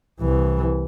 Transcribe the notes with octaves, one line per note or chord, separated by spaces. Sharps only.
C2 E3